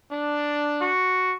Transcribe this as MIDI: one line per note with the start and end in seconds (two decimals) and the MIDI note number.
0.11 0.90 62
0.81 1.34 66